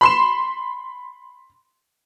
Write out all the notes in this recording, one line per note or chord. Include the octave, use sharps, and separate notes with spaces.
B5 C6 E7